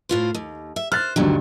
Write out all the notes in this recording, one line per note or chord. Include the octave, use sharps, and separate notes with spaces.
A2 F4 C5
D#2
E5
C5 F6 F#6 A6
D2 G2 B2 D3 D#3 F#3